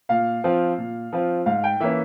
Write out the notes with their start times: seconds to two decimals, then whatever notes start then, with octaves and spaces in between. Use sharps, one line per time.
0.09 A#2 F5
0.44 F3 C4 F4
0.78 A#2
1.12 F3 C4 F4
1.46 G#2 F5
1.64 G5
1.80 E3 A#3 C#4 E5